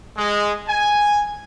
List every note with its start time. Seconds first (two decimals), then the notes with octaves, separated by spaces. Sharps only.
0.17 G#3
0.68 G#5